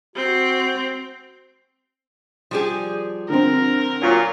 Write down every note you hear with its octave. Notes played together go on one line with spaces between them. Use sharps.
C4 F#4
F3 G3 G#4
D3 C4 A#4
A#2 F#3